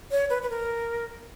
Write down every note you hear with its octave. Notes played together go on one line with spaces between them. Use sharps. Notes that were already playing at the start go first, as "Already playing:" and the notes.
C#5
B4
B4
A#4